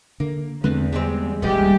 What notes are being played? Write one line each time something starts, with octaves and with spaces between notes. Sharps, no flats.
D3 A#3
E2 D3 G#3 A3 C4 B4
G3 G#3 B3 C4
D#1 A#1 D#2 C3 G3 G#3 B3 G4